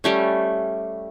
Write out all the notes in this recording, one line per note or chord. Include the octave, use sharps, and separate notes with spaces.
G3 A3 C#4